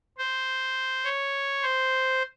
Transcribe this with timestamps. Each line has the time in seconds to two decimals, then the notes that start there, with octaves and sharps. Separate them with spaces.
0.18 C5
1.04 C#5
1.62 C5